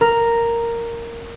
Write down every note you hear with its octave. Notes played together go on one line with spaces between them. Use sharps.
A#4